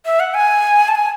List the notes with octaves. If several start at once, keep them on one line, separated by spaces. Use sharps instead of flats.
E5
F#5
G#5
A5
G#5